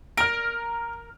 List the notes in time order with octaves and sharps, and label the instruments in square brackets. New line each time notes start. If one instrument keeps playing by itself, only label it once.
[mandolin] A#4 [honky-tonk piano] F6 D7